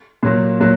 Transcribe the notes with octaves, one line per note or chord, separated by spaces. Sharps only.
A#2 F#3 A#3
A#2 F#3